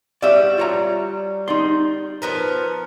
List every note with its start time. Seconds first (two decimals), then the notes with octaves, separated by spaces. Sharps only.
0.22 G3 F#4 D5 E5
0.58 F4 C#5 A#5
1.48 D#4 D5 C6
2.22 F3 B3 A#4